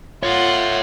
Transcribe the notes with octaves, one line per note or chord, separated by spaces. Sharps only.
F4 C#5 E5 F#5